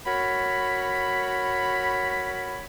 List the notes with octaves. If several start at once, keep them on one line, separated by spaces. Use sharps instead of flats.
F#4 A#4 C#5 B5